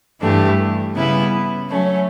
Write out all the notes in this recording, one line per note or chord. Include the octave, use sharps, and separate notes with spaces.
G2 E3 A3 D4 G4
C#3 G3 B3 E4 B4
F#3 A3 C#4